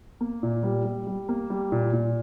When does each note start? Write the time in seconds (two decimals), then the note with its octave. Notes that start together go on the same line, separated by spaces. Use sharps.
0.21 A#3
0.43 A#2
0.63 G3
0.85 G3
1.07 G3
1.29 A#3
1.50 G3
1.72 A#2
1.93 A#2